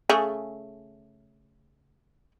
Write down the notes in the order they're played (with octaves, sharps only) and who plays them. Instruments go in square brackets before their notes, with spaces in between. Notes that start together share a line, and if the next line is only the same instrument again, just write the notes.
[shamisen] C#3 A3 G#4